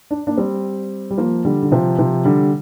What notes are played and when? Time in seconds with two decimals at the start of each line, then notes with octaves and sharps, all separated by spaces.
0.11 D4
0.27 A#3 D4
0.37 G3 C4
1.11 G3
1.18 F3 A#3
1.45 D3 G3
1.63 D3
1.72 C3 F3
1.98 C3 F3
2.25 D3 G3